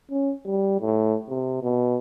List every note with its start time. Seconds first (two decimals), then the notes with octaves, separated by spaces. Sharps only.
0.11 C#4
0.45 G3
0.81 A2
1.29 C3
1.62 B2